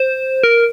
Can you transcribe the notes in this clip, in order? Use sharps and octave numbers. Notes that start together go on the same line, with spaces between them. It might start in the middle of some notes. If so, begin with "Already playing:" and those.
Already playing: C5
A#4